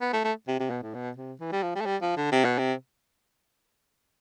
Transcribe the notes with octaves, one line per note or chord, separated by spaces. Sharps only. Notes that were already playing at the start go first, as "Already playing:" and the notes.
B3
A3
A3
C3
C3
B2
A2
B2
C3
E3
G3
F3
G3
A3
G3
F3
D3
C3
B2
C3